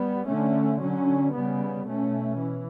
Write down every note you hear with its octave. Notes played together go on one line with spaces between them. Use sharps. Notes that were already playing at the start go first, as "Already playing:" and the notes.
Already playing: G3 B3
D3 A3 C#4
D3 F#3 C#4
C#3 G3 B3
B2 A3 C#4
E3